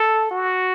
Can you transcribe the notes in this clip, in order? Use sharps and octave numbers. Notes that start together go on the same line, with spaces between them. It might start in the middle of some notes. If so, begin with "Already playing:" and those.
Already playing: A4
F#4